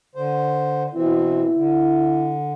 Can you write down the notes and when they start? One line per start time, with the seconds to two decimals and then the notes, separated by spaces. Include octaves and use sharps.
0.15 D3 C5
0.94 B2 E3 C4 E4
1.54 D3